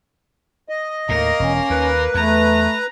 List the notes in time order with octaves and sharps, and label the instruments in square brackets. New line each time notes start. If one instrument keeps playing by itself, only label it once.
[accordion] D#5
[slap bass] D#2 A2 [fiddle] A#3 A#4
[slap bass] E1 [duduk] C#4
[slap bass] D#2 [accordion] B4
[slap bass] E2 [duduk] A3 [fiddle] A#5